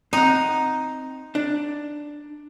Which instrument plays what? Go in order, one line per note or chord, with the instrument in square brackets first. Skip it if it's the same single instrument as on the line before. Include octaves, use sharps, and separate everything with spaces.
[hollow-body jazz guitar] C4 F#5 [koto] D#4
[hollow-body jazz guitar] D4